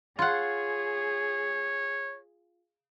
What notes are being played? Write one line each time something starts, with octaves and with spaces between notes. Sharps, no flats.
F4 G#4 C#5 F#5